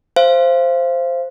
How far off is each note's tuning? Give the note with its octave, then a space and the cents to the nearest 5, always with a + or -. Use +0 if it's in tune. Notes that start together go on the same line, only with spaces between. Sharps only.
C5 +0 F5 -30